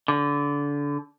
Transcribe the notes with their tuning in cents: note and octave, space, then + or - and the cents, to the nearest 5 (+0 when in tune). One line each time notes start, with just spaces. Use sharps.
D3 -25